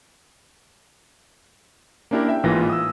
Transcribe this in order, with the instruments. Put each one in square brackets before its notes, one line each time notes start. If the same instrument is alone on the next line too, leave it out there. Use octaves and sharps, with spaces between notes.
[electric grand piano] A#3 C#4 D4 E4 G4 A#4
E5 G5
A1 G#2 E3 A#3 F4 A#6
D#6 E6